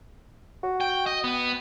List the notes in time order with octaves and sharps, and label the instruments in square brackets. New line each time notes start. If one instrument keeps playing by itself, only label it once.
[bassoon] F#4
[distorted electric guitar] G5
D#5
B3